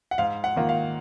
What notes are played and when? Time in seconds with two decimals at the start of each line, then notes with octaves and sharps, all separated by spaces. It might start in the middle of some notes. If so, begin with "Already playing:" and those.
0.11 F#5
0.18 G#2 F5
0.44 F#5
0.56 D#3 A#3 F4
0.69 F5